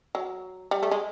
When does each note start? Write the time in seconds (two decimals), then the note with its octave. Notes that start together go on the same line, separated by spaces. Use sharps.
0.15 F#3
0.71 G3
0.83 A3
0.91 G#3